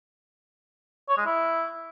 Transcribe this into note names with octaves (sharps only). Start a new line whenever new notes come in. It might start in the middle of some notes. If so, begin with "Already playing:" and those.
C#5
G#3
E4